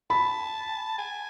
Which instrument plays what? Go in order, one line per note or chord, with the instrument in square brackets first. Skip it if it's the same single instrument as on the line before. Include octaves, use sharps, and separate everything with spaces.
[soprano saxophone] A5 [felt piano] B5
[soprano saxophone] G#5